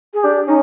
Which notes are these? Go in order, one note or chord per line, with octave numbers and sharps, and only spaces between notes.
G#4
D4 G4
C#4 D#4